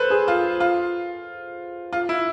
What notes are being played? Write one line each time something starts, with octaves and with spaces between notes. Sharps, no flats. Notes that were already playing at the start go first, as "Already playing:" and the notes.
Already playing: A4 B4 C5
G#4
F4
F4
F4
E4